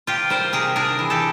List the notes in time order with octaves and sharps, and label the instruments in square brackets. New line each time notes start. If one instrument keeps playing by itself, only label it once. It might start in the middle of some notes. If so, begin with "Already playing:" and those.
[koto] C3 F4 G4
G3 A#4 C5
C3 G#4 A#4
D4 G#4 A#4
E3
G4 A4